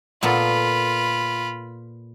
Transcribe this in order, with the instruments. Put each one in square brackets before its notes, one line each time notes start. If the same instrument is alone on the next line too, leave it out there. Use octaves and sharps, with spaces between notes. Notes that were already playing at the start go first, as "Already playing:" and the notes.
[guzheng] A#2 B3 A4 [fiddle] F4 B5